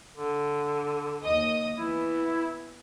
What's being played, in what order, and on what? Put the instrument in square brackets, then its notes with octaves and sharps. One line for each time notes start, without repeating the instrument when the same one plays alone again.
[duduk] D3
[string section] D#2 D#5 D#6
[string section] E3 B3 [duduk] E4